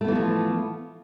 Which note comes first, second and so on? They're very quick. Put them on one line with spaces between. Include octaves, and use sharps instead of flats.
A3 B3 E3 F4 F3